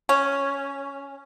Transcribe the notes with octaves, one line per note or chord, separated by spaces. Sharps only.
C#4